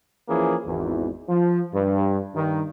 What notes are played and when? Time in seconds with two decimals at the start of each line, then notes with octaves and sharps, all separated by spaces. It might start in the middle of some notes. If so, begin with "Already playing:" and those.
0.29 E3 F3 A#3 C#4 G#4
0.66 G#1 E2
1.29 F3
1.74 G2
2.35 G2 D#3